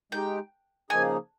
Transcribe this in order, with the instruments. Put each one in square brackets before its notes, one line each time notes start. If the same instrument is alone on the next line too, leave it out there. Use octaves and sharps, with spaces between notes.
[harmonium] G#3 D#4 G4 [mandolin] G5
[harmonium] C#3 F3 A#3 D#4 G#4 [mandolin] G#5